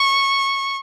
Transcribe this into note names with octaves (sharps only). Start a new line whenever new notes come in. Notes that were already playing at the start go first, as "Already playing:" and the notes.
Already playing: C#6